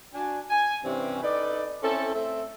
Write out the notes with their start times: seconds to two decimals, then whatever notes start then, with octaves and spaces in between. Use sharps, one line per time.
0.14 D4 F#4 G#5
0.50 G#5
0.85 G2 C3 E3 C4 C#4
1.23 D#4 A4 B4 D5
1.83 C4 C#4 E4 A4
2.14 A3 C4 A4 E5